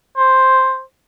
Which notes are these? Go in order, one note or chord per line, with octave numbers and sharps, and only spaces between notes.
C5